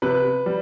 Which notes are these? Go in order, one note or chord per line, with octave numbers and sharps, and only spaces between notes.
C3 B4
G3